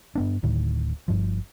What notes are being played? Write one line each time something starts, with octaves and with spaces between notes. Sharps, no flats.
G2 B3 D4
D1 D2 A2 D#3
G1 G2 F3